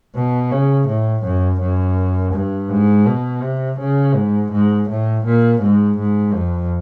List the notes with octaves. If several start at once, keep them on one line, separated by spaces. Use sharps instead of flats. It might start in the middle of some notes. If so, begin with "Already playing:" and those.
B2
C#3
A2
F#2
F#2
G2
G#2
B2
C3
C#3
G#2
G#2
A2
A#2
G#2
G#2
F2